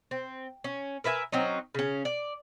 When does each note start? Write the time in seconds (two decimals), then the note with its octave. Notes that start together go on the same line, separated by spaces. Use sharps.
0.11 C4
0.64 C#4
1.04 A#4 B4 E5 G#5
1.32 F#3 C4 C#4 D#4
1.75 C#3 C#4
2.05 D5